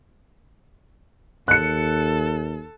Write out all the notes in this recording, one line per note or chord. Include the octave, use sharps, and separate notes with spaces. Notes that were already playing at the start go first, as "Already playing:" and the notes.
D#2 A4 F#6 C#7